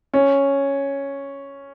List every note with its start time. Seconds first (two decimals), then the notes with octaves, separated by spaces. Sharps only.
0.14 C#4